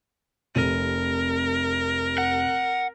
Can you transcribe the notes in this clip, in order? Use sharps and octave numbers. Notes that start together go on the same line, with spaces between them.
F1 C3 A#4 D#7
F#5